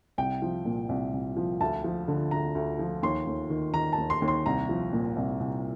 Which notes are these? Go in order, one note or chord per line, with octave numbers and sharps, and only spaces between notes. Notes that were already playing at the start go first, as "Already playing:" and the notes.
C2 G5
F3
A#2
C2
C2
F3
D2 A5
F3
D3
D2 A#5
D2
F3
D#2 C6
D#2
D#3
D#3 A#5
A5
D#2
C6
D#2
C6
C2 A#5
F3
A#2
C2
C2